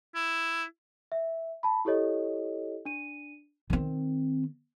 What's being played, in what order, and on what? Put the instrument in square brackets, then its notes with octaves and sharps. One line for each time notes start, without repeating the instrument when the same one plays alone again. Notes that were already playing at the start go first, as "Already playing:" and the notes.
[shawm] E4
[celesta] E5
A5 B5
E4 G4 A4 C#5 D#5
D4 D#7
[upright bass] D#3 C4